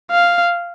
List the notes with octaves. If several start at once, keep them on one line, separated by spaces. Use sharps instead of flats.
F5